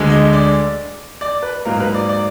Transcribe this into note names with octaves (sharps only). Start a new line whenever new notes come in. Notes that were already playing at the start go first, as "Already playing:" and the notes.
Already playing: D2 D3 G#3
D#5
D5
D5
B4
G#2 F#3 A#3 A#4
B4
D5
D5